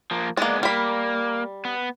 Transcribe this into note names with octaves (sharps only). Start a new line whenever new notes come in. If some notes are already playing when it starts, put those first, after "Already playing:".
F3 A#3
G#3 A#3 B3 D5
G3 A#3 B5
B3